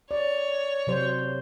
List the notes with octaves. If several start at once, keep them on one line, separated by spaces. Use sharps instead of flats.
C#5 D5
C3 F#3 C5